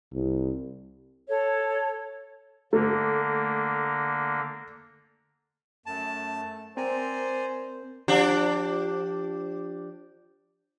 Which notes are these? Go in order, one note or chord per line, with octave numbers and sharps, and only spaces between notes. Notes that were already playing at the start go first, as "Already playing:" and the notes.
C2
A4 C#5
D3 A3 A#3
F#2 A3 A5
C4 A#4 C5 D5 G#5 A#5
F3 D4 G4